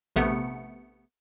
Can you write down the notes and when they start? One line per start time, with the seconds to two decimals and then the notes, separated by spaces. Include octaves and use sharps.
0.16 A#1 C3 A3 B3 C#7